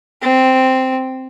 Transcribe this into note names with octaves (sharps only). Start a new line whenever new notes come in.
C4